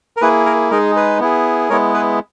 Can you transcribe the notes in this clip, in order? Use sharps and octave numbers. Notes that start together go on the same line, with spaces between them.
A#4
A#3 E4 G#4 B4
A#4
G#3 D#4 G#4 A#4
G#4 B4
B3 E4 G#4
G#3 B3 E4 A#4 C#5
G#4 B4